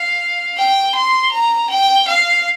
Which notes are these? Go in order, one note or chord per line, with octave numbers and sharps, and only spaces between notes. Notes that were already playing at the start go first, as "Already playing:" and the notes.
Already playing: F5
G5
C6
A#5
G5
F5